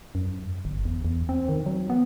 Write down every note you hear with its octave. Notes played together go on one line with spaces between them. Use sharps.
F#2
G1
E2
E2
C4
D#3
F#3
B3